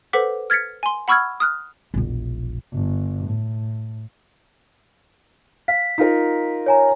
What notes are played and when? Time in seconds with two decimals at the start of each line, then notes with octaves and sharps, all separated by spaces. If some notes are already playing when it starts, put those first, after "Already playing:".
0.13 A4 B4 C5 F#5 D6 B6
0.50 F6 G#6 A6 B6 C#7
0.83 G#5 C6
1.08 F#5 B5 C#6 E6 F6 G#6
1.40 D#6 F6 F#6
1.94 E1 A#1
2.73 G1
3.25 A2
5.68 F5 B6
5.98 D#4 F4 A#4
6.66 C#5 G#5 A#5